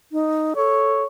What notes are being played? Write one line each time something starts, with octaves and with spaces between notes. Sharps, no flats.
D#4
A4 C#5